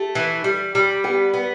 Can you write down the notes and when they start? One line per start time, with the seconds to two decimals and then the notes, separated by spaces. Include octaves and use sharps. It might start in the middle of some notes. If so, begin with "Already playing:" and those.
Already playing: A3 G4
0.15 E3
0.44 G3
0.75 G3
1.04 B3 G4
1.34 B3